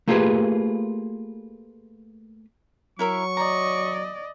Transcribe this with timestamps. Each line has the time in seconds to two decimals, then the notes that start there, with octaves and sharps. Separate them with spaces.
0.08 A3 A#3 F4 G4 G#4 B4
2.99 F#3 E4 A#4 E5 C#6
3.37 D5 D#5 A#5